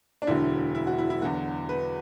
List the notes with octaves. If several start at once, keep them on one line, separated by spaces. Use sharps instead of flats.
D4
E1 D2 D3 F#3 E4
E4
F#4
E4
E4
E2 D3 F#3 F#4
B4